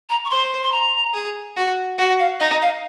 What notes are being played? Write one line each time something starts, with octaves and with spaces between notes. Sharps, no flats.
A#5
C#6
C5 C6
C6
A#5
G#4
F#4
F#4 F#5
F5
D#4 D#5
F5